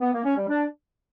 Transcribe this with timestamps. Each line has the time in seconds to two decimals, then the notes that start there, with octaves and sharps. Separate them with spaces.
0.01 B3
0.13 A#3
0.25 C#4
0.37 G3
0.49 D4